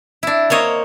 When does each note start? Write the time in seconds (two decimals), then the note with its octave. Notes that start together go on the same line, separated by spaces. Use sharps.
0.23 D4 E4
0.50 A#3 C5 C#5 D#5